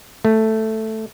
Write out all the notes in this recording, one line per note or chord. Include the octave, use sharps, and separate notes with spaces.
A3